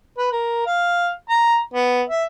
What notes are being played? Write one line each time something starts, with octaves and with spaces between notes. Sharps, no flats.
B4
A#4
F5
A#5
B3
E5